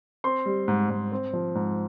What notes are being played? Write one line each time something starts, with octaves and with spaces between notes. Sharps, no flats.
C4 C6
G3
G#2
G#2
C4
F3
G#2